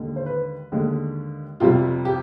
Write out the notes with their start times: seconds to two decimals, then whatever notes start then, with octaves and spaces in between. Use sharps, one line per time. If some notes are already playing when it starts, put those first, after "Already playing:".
Already playing: D#2 D3 G#3
0.16 C5
0.26 B4
0.72 D#2 D3 G#3
1.60 F2 C3 G3 F4
2.05 G4